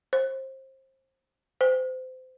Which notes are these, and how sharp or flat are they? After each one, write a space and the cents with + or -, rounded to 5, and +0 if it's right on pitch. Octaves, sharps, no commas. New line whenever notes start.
C5 +25
C5 -25